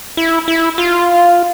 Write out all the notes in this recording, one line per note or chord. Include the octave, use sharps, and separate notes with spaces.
E4
E4
F4